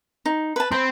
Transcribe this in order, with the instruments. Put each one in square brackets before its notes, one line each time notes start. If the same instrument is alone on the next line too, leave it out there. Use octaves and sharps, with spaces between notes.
[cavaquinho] D#4
B4 A5
[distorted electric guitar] C4 [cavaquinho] B5